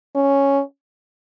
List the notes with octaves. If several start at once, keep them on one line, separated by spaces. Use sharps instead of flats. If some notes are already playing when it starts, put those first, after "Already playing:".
C#4